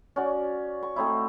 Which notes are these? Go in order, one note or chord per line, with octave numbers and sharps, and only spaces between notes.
C#4 F#4 D5
C#6
A3 C4 D#4 E4